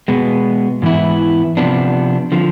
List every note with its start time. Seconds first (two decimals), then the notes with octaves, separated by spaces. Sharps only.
0.08 B2 G#3 B3
0.82 G#2 E3 B3 E4
1.57 C3 F3 B3 D4
2.32 D3 F3